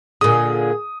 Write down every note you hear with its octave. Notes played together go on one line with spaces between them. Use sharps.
A#2 D3 G#4 D#6